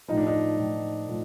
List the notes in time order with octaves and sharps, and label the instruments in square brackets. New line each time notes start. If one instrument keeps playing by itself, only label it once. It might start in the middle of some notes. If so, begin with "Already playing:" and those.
[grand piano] A2 F3 D#4
D4
D#4
A2 F3
A2 F3